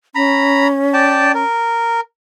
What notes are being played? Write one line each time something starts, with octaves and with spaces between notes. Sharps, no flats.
C#4 A#5 B5
D5 G5 A5
A#4